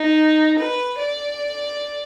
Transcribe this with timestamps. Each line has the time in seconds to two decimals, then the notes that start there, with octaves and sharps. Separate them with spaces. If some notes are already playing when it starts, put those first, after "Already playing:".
Already playing: D#4
0.59 B4
0.98 D5